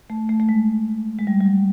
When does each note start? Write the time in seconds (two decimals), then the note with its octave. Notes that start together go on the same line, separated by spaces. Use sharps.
0.10 A3
0.29 A3
0.40 A3
0.49 G#3
1.19 G#3
1.27 G3
1.41 G3
1.46 F#3